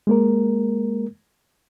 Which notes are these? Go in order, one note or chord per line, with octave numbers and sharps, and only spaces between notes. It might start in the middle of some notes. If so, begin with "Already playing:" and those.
G#3 A#3 A#4